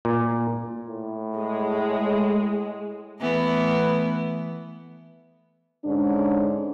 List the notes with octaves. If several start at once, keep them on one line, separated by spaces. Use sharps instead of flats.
A#2
A2
G#3
E3 A3 B3
G#2 D3 C#4 D4